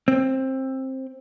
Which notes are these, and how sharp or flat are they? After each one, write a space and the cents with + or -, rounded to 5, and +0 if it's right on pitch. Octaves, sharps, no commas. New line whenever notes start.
C4 +15